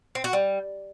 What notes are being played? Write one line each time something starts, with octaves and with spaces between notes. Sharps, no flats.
C4
F#4
G3